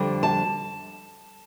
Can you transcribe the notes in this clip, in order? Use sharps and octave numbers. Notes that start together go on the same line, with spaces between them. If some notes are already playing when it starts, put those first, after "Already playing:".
Already playing: F2 D3 G3
A5